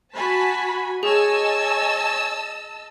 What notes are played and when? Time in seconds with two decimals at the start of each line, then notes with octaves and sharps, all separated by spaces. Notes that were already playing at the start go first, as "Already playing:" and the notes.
0.15 F#4 G#5 A5 B5 B6
1.03 G#4 C#5 D#5 G#5 A5 E6